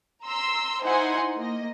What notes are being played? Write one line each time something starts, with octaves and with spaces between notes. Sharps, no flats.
A#5 C6 E6
D#4 E4 C5 F#5 G#5 C6
A#3 D#5